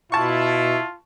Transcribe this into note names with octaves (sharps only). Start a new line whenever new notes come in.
B2 E4 F4 A5 C#6